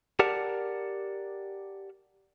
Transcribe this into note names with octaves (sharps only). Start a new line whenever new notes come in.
G4 A#4 D5 F#5 A5